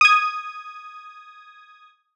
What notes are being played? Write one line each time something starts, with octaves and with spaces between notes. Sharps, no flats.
D#6 G#6